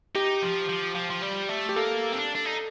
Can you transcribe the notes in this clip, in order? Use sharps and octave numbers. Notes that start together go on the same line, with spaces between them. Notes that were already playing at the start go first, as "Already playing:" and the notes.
D#4 G4
F3
F3
F3
F3
G3
A3
G4
A#3 A4
C4
D4
D4
D#4